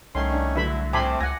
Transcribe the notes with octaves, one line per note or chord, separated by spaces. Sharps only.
C2 D#3 A3 C#4 C6
D4
D3 F#3 A3 E4 E5 B5
A#1 A3 C4 G#5 A5 B5 C6 D6
C#2 F#5 G#5 A#6